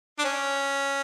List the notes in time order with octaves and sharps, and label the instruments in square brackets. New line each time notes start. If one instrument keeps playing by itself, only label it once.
[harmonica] D4
C#4